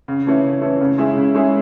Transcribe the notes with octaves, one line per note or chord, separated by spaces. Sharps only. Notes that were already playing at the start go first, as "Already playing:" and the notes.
C#3
E3 A3 C#4 E4
C#3
E3 A3 C#4 E4
C#3
G#3 C#4 E4 G#4
C#3
G#3 C#4 E4 G#4